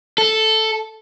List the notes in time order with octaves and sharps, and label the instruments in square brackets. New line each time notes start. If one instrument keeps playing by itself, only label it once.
[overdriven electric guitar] A4